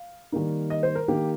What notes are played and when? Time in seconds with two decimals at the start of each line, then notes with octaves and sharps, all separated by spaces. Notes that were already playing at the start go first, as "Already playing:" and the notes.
Already playing: F5
0.32 D#3 G3 A#3 D#4
0.70 D#5
0.83 C5
0.95 A#4
1.08 D#3 A#3 D#4 G4